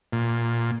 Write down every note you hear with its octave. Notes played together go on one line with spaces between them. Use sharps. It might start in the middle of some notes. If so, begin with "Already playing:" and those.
A#2